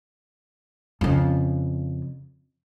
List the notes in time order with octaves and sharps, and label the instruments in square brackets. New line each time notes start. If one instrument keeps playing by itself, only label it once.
[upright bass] F2 C#3